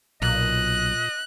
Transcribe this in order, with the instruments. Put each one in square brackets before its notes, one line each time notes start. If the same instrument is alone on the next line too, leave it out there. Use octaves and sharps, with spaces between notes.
[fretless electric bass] B1 [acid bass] A#2 [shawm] D#5 [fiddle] F#6